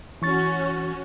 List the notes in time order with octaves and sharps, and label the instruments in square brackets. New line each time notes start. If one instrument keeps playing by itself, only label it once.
[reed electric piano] E3 C#6 A6 [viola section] C#4 F#4